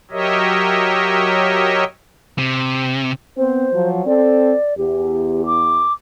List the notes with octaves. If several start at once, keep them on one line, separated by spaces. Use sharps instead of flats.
F#3 G4 A#4 C#5 D#5 E5
C3
B3 C4 C5
F3 F#3
C4 A4 D5
E2 G4
D6